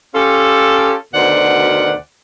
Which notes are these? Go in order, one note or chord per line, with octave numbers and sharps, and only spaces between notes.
C#4 F4 G4 A4
D2 B2 D#3 C5 D5 F#5